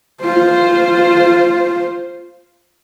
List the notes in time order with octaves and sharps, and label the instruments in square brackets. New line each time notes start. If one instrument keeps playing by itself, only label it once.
[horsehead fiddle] F4 C5